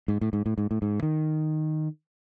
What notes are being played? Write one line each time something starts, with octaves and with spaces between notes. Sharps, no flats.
G#2
A2
G#2
A2
G#2
A2
G#2
D#3